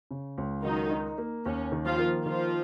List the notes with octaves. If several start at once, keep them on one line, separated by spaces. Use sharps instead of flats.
C#3
C#2
D#3 F#3 D#4
D#4
A#3
D#2 C#4
D#3
F3 F4
A#3
D#3 F3 F4